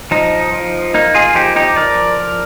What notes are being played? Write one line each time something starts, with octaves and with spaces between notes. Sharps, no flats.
F3 D#4
F3
A#3 D#4
F4 G#4
F3 D#4 G4
D#4 G4
F3 A#4 D5